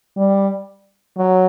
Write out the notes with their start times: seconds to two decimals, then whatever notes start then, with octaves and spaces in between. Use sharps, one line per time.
0.17 G3
1.17 F#3